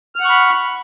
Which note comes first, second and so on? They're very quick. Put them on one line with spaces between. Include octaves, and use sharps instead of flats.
F6 F#5 C#6 B5